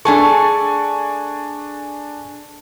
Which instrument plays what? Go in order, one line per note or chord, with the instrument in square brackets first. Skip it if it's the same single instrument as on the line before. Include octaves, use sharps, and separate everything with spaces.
[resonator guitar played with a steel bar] A3 G#4 A4 [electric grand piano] D4 G#5 C#6